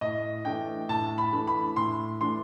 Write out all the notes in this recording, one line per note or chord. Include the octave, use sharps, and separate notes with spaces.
A2 D#5
E3 A3 D4 G5
A2 A5
B5
E3 A3 D4
B5
A2 C6
E3 A3 D4 C6